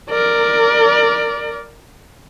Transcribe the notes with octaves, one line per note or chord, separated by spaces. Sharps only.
A#4 D5